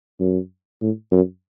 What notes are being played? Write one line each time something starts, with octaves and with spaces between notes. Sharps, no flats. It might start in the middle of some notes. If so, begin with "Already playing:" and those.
F#2
A2
F#2